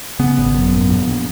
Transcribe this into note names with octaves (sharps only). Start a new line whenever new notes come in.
C#3 B3
G#1
F#2
A#1
A#1
A#1